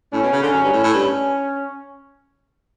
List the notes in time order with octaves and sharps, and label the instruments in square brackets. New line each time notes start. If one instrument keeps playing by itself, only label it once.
[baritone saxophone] A2 [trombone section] C#4
[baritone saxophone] B2
C#3
D3
F#2
G2
A2
A2
[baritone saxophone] G2 [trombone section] C#4